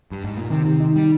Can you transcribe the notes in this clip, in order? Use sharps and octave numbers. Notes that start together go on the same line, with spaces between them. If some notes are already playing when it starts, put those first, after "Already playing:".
G2
G#2
A#2
C3 D#3
C3
D#4
G3